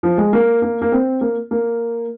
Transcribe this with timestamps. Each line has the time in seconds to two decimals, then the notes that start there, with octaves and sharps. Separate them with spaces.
0.03 F3
0.18 G#3
0.33 A#3
0.62 A#3
0.82 A#3
0.92 C4
1.21 A#3
1.51 A#3